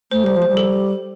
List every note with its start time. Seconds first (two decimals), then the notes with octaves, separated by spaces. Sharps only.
0.11 A3 C5
0.24 G3 C5
0.36 F3
0.42 C5
0.48 G3
0.57 A4